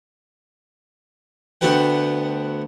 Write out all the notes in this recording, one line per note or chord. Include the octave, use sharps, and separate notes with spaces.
D2 D3 B3 F#4 B4 G5